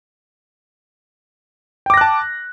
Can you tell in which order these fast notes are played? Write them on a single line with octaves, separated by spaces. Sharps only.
G5 D6 A#6 F#6 A5